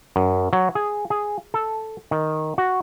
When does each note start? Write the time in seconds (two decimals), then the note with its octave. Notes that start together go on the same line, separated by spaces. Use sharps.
0.16 F#2
0.53 F#3
0.75 G#4
1.10 G#4
1.54 A4
2.11 D#3
2.58 F#4